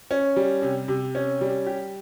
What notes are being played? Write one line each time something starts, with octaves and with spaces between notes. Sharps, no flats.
C#4
G3
C3
C3
C#4
G3
G4